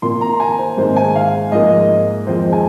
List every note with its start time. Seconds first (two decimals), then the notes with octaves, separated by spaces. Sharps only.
0.02 A#2 A#3 C6
0.21 A#5
0.40 G#5
0.58 C5
0.77 G#2 D#3 G#3 C4 C5
0.96 G#5
1.15 F5
1.52 G#2 F3 A#3 D#5
2.27 F2 F3 G#3 C4 C5
2.53 G#5